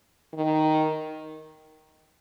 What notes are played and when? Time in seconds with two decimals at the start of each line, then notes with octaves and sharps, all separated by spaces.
0.33 D#3